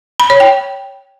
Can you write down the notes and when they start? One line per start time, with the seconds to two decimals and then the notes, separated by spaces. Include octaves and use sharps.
0.20 B5
0.30 C#5
0.40 G5